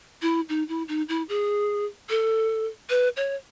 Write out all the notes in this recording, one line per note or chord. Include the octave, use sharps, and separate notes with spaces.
E4
D#4
E4
D#4
E4
G#4
A4
B4
C#5